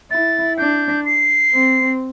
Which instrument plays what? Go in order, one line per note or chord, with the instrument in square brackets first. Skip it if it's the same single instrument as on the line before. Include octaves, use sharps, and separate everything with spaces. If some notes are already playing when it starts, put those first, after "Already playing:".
[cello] E4 [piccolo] A6
[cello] D4 [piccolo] G6
[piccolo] C7
[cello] C4